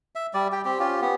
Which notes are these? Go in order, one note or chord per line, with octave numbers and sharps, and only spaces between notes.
E5
G3 D5
G4 G5
C4 G4
C#4 F4 G4
B3 G4